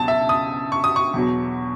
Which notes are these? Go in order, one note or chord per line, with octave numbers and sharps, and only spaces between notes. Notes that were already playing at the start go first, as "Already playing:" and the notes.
Already playing: C#2 B2 F#3 A5
E5
D#6
C#6
D#6
C#6
E2 B2 F#3